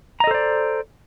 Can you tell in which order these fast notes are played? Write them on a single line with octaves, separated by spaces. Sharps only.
A#5 D#5 A4 C5 D5